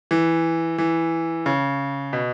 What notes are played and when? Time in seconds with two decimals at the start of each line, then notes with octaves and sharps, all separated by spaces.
0.11 E3
0.78 E3
1.46 C#3
2.13 B2